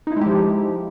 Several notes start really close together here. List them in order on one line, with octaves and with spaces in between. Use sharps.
D#4 E4 G#3 G4 F3